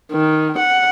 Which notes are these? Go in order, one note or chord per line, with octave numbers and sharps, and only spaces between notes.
D#3
F#5